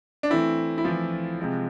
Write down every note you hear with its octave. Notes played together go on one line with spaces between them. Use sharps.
D4
E3 A3 C4 E4
E4
E3 F3 A3 C4 F4
C3 G#3 C4